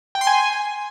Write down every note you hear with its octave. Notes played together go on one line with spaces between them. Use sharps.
G5
C6
G#5